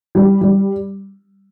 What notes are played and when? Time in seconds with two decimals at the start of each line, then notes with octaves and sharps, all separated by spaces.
0.15 G3
0.41 G3